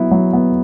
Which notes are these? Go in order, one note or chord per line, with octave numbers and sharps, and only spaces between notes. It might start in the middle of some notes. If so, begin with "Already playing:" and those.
Already playing: F#3 B3 E4
F#3
B3